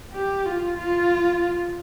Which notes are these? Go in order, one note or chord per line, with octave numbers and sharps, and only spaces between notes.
G4
F4
F4